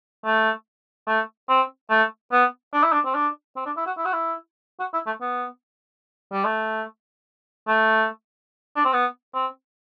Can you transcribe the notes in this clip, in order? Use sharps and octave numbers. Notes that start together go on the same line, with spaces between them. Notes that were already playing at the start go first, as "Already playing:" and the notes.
A3
A3
C4
A3
B3
D4
E4
D4
C4
D4
C4
D4
E4
F#4
E4
F#4
E4
F#4
E4
A3
B3
G3
A3
A3
D4
C4
B3
C4